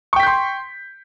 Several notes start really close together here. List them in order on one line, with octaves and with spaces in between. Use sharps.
C#6 G5 B6 G6 C6